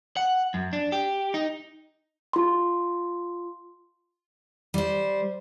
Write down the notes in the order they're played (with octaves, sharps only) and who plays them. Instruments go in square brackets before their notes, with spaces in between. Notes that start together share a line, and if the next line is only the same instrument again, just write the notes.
[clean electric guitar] F#5
F#2
D4
G4
D#4
[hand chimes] F4 C6
[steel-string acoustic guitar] G3 C5